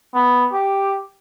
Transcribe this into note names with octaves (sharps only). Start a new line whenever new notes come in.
B3
G4